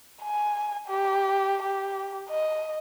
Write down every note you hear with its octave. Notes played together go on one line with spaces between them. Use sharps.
G#5
G4
G4
D#5